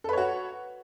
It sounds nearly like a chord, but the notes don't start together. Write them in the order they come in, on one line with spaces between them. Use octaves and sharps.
A4 B4 C#5 F#4